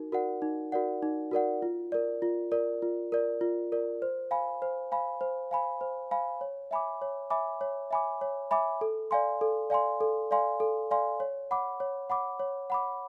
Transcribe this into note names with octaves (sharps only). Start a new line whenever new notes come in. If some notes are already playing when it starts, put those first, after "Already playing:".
Already playing: D#4 F#4 A#4
F#4 A#4 D5 F#5
D#4
F#4 A#4 D5 F#5
D#4
F#4 A#4 D5 F#5
F4
A#4 D5
F4
A#4 D5
F4
A#4 D5
F4
A#4 D5
C5
F5 G#5 B5
C5
F5 G#5 B5
C5
F5 G#5 B5
C5
F5 G#5 B5
C#5
E5 G#5 B5 D6
C#5
E5 G#5 B5 D6
C#5
E5 G#5 B5 D6
C#5
E5 G#5 B5 D6
A4
D5 F5 G#5 C6
A4
D5 F5 G#5 C6
A4
D5 F5 G#5 C6
A4
D5 F5 G#5 C6
C#5
F#5 B5 D6
C#5
F#5 B5 D6
C#5
F#5 B5 D6